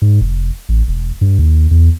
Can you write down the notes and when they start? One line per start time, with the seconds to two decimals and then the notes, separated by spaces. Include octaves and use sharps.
0.02 G#2
0.21 F1
0.69 A1
0.88 E1
1.21 G2
1.39 D#2
1.71 E2